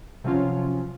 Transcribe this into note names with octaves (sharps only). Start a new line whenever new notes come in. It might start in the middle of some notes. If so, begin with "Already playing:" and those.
C3 F3 F#3 C#4 F4